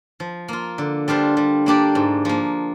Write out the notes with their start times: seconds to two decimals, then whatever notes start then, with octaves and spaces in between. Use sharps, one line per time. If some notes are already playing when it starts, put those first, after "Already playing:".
0.20 F3
0.48 A#3 F4
0.78 D3
1.08 G3 D4 F4 C5
1.37 G3
1.66 A#3 D4 G4 D5
1.95 G#2
2.25 F3 A#3